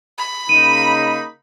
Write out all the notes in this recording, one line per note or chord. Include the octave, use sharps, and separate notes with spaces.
B5
C#3 A#3 D#4 D#7